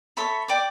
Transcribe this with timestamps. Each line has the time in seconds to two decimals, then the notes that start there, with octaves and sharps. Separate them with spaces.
0.17 A4 C#5 E5 B5
0.48 D5 G5 D6